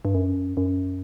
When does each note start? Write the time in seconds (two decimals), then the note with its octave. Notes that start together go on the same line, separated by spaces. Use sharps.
0.05 G2
0.14 F#2
0.57 F#2